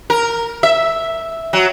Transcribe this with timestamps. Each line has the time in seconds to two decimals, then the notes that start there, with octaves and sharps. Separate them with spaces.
0.10 A#4
0.63 E5
1.53 F#3